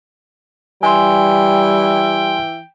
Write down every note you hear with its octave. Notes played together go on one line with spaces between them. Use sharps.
E3 G3 G5 G#5 C6